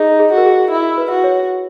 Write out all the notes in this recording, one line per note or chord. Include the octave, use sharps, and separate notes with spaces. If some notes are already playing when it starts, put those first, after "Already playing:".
Already playing: D#4 G#4
G#4
F#4 A#4
G#4
E4
B4
F#4
C#5